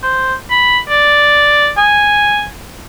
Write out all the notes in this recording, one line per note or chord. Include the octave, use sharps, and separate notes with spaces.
C5
B5
D5
G#5